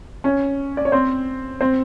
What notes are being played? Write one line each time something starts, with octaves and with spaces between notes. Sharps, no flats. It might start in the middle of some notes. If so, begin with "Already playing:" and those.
C#4 C#5
D5
C#5
C4 C5
C4 C5